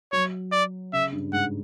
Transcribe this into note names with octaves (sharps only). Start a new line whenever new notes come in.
F#3 C#5
D5
C#3 E5
G2
G#2 F#5